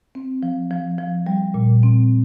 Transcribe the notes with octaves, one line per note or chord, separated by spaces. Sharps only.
C4
F3
F3
F3
G3
A#2
C4